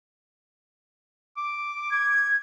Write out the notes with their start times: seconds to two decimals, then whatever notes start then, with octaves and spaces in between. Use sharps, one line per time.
1.37 D6
1.90 G#6